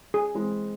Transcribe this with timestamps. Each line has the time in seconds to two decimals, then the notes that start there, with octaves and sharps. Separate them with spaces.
0.14 G#4
0.35 E3 G#3 C4